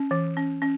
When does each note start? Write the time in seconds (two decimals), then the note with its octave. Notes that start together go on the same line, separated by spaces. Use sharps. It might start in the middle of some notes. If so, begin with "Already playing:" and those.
Already playing: C#4
0.11 E3
0.37 C#4
0.62 C#4